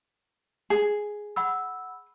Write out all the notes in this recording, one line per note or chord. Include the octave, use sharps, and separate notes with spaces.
G#4
F#5 B5 E6